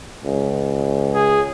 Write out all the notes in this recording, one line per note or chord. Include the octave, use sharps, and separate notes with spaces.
C#2
G#4